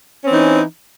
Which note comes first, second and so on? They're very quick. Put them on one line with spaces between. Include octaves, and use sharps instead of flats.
C#4 C4 D#4 E3